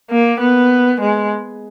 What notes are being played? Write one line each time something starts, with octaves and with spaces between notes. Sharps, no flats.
A#3
B3
G#3